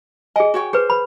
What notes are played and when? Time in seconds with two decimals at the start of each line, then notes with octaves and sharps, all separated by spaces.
0.36 G#4 D#5 G#5
0.54 F#4 C#5 G5
0.73 G#4 B4 C5
0.90 B4 B5